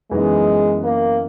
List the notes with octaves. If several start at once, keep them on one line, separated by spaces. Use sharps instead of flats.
F#2 E3 G#3 B3 D#4
A#3